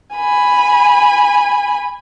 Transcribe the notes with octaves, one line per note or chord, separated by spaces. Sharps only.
G#5 B5